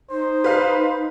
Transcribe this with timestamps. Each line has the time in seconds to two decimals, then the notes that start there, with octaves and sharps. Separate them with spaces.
0.11 D#4 C5
0.44 B4 F5